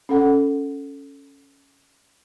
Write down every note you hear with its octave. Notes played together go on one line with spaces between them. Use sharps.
C#4 A4 F#5